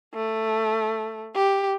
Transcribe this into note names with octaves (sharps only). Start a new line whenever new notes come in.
A3
G4